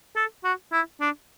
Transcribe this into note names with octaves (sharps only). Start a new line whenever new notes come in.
A4
F#4
E4
D4